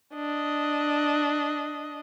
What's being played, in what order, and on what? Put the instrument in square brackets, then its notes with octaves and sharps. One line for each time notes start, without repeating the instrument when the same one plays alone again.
[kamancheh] D4 D#5